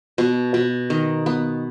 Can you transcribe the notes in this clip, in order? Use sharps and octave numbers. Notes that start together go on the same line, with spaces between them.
B2
B2
D#3
B3